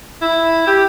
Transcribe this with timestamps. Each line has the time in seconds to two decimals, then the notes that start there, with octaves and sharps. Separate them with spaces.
0.21 E4
0.67 G4